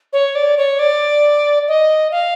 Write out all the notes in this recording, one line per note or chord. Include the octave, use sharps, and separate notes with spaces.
C#5
D5
C#5
D5
D#5
F5